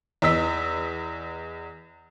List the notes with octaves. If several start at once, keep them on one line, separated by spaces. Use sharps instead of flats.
E2 D#5 E6 B6